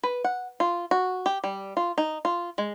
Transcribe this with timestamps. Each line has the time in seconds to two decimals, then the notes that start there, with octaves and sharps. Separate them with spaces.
0.03 B4
0.24 F#5
0.60 F4
0.91 F#4
1.26 G4
1.44 G3
1.77 F4
1.98 D#4
2.25 F4
2.58 G#3